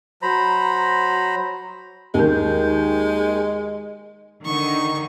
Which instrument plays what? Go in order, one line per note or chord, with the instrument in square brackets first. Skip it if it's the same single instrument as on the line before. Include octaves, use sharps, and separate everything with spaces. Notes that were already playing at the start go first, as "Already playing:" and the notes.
[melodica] F#3 C5 A#5 B5
[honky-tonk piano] D#2 D#3 [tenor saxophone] G#3
[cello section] D3 D#3 D#4 [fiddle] C#6